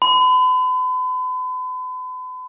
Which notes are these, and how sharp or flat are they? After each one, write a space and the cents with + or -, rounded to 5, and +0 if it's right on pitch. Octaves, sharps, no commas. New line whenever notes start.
B5 +40